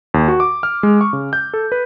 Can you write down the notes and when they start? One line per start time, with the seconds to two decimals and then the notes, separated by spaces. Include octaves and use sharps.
0.14 D#2
0.28 F#4
0.40 D6
0.63 F6
0.83 G#3
1.01 C#6
1.13 C#3
1.33 G6
1.54 A4
1.72 B4